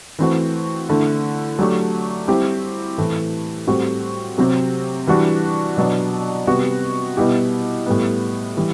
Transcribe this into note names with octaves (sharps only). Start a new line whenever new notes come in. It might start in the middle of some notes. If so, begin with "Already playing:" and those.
E3 A3 C4 F#4
D3 A3 E4
F#3 A3 D4 G4
G3 C4 E4 G4
A2 E3 A3
A2 G3 C4 F#4
C3 F#3 C4 G4
E3 G3 D4 F#4
B2 F#3 B3 D4
C3 G3 B3 F#4
B2 G3 B3 E4 G4
A2 G3 B3
E3 G3